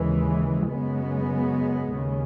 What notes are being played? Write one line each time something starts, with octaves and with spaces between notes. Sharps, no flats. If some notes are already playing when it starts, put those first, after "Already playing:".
Already playing: D#2 C#3 E3 G#3
F#2 C#3 G#3 B3
D#2 C#3